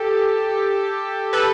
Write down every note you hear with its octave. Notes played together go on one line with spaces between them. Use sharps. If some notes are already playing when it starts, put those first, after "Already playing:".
Already playing: G4 A4
A4 B4